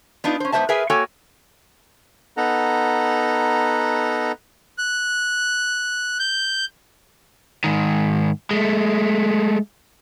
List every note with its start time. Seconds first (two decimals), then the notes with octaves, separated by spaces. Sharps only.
0.24 B3 D4 D#4 F4
0.40 C#4 C5
0.52 G#2 B3 C5 D5 E5 A5
0.69 G#4 A#4 B4 E5 G#5
0.90 A#3 F#4 A4 C#5 G5 G#5
2.37 B3 D#4 A4 F#5 A#5
4.78 F#6
6.19 G6
7.64 G#2 D#3
8.51 G#3 A3